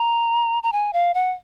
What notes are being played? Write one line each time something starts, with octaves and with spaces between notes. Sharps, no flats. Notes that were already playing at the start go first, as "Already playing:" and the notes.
Already playing: A#5
A#5
G#5
F5
F#5